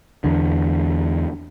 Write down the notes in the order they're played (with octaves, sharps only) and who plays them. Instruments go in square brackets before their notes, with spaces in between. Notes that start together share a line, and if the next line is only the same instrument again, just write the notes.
[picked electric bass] E2 D3